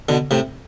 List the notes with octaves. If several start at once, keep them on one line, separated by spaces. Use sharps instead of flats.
B2 D3
A2 C3